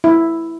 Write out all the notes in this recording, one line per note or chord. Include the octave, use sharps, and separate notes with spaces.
E4